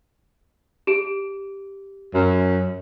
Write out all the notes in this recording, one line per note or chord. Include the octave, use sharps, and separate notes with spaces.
G4 D7
F#2